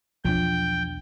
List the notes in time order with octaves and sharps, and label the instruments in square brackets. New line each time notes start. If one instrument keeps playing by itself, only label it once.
[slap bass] B1 E2 D4 [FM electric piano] F3 [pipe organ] G5